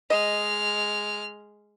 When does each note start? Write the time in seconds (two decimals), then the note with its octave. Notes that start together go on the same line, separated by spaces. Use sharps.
0.10 G#3 D#5 F6